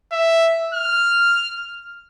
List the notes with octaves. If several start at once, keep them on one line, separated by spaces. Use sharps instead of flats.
E5
F6